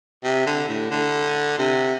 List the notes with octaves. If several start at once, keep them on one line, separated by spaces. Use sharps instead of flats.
C3
D3
A2
D3
C3